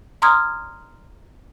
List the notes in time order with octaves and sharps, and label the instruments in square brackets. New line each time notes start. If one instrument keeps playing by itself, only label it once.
[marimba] A#5 C6 D#6 F6 G#6